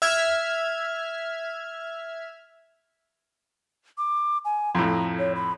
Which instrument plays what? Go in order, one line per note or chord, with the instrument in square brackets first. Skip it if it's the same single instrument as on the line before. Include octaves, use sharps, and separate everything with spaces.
[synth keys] E5 F6 G#6
[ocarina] D6
G#5
[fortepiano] F2 A2 [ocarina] A#5
[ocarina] C#5
B5